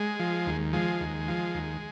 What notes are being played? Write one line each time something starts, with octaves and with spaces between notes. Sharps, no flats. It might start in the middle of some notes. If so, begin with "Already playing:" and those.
Already playing: G#3
F3
D#2
F3 G#3
D#2
F3
D#2